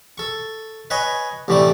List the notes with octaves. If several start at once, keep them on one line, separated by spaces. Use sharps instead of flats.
A4 C#6
B4 C#5 D#5 G#5
A1 C3 E3 A3 D5